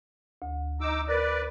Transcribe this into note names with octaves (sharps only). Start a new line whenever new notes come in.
D2
D#4 D6 E6
A#4 B4 D5